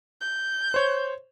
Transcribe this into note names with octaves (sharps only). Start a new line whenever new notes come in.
G6
C5 C#5